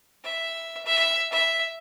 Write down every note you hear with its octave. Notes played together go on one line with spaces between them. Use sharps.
E5
E5
E5